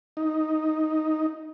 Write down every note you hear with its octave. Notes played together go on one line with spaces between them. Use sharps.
D#4